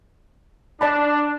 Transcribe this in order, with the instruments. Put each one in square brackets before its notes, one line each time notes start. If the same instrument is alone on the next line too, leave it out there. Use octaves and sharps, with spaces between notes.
[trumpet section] D4 [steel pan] D5 A5 B5